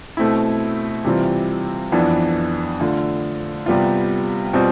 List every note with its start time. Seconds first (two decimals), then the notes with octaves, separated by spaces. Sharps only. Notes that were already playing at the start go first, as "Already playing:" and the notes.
0.17 B2 A3 C4 E4
1.04 C3 E3 G3 C4 F4
1.92 F2 E3 B3 D4
2.80 D3 A3 D4 F4
3.66 C3 G3 B3 F4
4.53 B2 G3 C4 F4